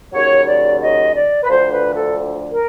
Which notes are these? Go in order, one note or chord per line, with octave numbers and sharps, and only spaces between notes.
D#2 C#3 F#3 C#5
D5
D#5
D5
B4
D2 D3 F3 C5
B4
A4
A#4